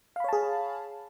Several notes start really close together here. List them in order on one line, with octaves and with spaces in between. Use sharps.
F5 B5 C#5 A5 G#4